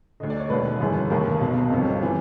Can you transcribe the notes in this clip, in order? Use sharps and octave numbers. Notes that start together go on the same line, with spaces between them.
D2 D3 D#5
D5
C#5
E1 D#2 D#3 B4
G1 F#2 C#3 E3
F1 D#2 D#3 A#4
B1 B2
G1 F2 C3
C3 E3